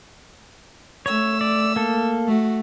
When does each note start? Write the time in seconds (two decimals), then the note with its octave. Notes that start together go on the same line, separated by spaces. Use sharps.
1.06 A3 C#5 E6
1.41 D5
1.76 A#3 A4
2.28 A3 F#4